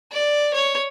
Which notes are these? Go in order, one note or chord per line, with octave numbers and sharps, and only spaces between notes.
D5
C#5